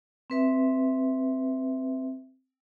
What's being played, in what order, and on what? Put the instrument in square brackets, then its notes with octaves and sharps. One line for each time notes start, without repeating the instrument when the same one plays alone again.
[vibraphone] C4 B4 E5